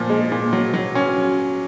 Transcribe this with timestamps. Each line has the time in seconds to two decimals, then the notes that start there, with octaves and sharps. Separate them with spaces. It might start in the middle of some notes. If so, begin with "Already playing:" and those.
Already playing: A#2 F3
0.10 G#3
0.32 A#2
0.53 F#3
0.74 F#3
0.95 C#4